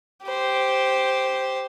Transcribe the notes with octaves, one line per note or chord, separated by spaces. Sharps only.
G4 C5